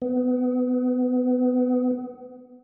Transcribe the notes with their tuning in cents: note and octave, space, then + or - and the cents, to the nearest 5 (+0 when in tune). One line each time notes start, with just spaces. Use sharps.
B3 +25